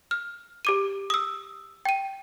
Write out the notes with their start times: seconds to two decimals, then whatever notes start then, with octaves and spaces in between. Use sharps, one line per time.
0.11 F6
0.65 G4 D6 D#7
1.10 D#6 E6
1.85 G5 D#7